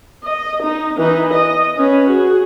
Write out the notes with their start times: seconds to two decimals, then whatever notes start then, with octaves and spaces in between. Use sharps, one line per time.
0.24 D#5
0.63 D#4
0.97 E3 D#4
1.34 D#5
1.77 C#4 B4
2.09 F#4 G#4